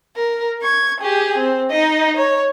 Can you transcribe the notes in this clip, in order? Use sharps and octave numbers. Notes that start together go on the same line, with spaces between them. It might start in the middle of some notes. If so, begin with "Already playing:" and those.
A#4
C#6 G#6
G4 G#4
C4
D#4 D#5
C#5